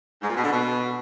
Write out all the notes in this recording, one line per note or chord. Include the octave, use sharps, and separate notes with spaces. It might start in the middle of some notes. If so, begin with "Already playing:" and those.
G#2
A#2
B2
D3
B2